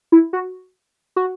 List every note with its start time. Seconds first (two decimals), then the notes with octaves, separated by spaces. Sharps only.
0.12 E4
0.33 F#4
1.16 F#4